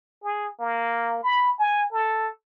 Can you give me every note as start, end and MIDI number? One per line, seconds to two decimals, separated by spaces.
0.24 0.48 68
0.60 1.21 58
1.23 1.51 83
1.59 1.84 80
1.93 2.29 69